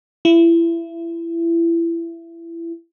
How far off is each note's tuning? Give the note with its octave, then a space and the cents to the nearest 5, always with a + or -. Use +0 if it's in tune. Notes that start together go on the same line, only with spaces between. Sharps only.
E4 +25